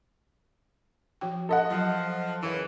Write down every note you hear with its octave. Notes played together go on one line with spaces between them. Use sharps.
F3 F#4 G5
A4 D#5 F#5
F3 F#3
F#2 C#3 E3